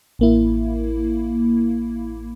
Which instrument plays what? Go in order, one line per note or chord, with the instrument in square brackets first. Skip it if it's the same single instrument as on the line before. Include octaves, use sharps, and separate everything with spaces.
[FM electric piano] A1 A#3 E4